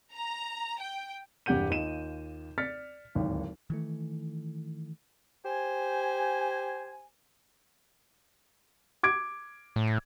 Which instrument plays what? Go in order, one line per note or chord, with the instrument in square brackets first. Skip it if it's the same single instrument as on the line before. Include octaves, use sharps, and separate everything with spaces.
[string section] A#5
G5
[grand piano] E1 G2 G4 F#5 G6 D#7
D#2 F4 D#5 D#7 E7
D5 F6 A6 B6 C#7
D1 G#1 D#2
[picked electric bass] D#3 E3 A3
[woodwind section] G4 C5 G#5
[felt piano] D6 G#6 D7
[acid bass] A2